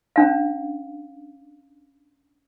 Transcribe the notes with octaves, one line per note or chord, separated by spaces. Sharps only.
C#4 D4 F5